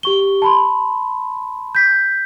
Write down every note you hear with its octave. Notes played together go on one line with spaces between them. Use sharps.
G4 C#6 G7
A5 B5 C6
G6 B6